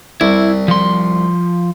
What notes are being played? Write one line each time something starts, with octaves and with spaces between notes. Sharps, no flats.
C2 E4
F3 C6